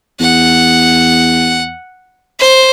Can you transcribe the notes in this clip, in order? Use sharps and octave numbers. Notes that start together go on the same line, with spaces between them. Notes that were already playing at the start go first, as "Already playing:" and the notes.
E2 F#5
C5